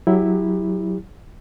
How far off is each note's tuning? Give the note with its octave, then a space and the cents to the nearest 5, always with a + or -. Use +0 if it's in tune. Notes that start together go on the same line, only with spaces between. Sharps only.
F#3 +10 E4 -5 G4 +30